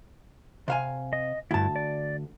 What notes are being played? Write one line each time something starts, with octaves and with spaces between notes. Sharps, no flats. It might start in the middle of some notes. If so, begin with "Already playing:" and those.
C3 F5 G#5
D#5
D2 G2 E4 A5
D5